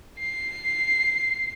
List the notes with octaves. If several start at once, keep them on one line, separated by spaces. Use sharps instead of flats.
C7